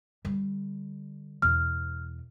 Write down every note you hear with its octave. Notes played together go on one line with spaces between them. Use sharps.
D3 G3
E2 B2 F6